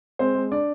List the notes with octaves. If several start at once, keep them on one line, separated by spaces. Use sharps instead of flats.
G#3 C4 C5
G#3
D4 D5